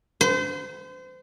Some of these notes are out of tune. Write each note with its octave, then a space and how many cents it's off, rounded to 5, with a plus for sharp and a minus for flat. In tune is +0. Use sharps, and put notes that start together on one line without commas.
C5 -35